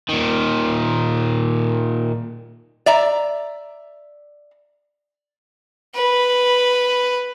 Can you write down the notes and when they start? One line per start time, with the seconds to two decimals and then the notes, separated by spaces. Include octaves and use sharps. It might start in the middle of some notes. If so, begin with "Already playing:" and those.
0.09 A#2 D#3
2.86 D5 E5 A#5
5.95 B4